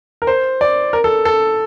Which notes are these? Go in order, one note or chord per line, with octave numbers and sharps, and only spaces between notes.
A#4
C5
D5
A#4
A4
A4